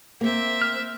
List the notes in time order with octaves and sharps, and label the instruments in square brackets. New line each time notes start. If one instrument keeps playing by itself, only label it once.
[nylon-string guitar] A#3 [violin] C4 E5
[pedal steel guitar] F6